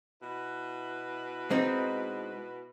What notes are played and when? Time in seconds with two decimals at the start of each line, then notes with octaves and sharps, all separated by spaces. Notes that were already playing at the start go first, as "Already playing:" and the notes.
0.22 B2 E4 B4
1.50 G#3 C4 D#4